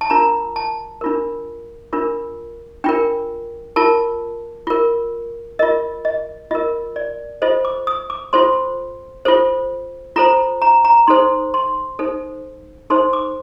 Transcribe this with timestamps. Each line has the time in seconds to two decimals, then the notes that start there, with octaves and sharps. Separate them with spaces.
0.01 A5
0.10 D4 F4 A#4 A#5
0.56 A5
1.01 D4 F4 A#4
1.93 D4 F4 A#4
2.84 D4 F4 A#4 G5
3.76 F4 A#4 A5
4.67 F4 A#4
5.59 F4 A#4 D#5
6.05 D#5
6.51 F4 A#4 D#5
6.96 D5
7.42 F4 A4 C5 D#5
7.65 D6
7.87 D#6
8.10 D6
8.33 F4 A4 C5 C6
9.25 F4 A4 C5
10.16 F4 A4 C5 A#5
10.62 A#5
10.85 A#5
11.07 D#4 A4 C5 C6
11.54 C6
11.99 D#4 A4 C5
12.90 D#4 A4 C5 C6
13.13 D6